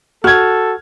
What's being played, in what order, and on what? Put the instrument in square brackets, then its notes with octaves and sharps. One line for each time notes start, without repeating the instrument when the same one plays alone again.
[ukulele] F#4 [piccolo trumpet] A4 [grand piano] F6 G#6